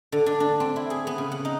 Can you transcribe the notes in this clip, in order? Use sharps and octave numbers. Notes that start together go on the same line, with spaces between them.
D3
D4
D4
C4
E4
G#4
B3
C#3
F#5
D#4